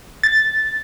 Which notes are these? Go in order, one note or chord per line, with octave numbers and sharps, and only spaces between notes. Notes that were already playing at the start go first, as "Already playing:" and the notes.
A6